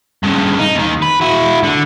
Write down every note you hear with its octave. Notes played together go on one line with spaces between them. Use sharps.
G2 C#3
D#4
D#2 D#3
B4
E4 F#4
D3